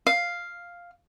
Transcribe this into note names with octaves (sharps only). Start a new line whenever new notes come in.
F5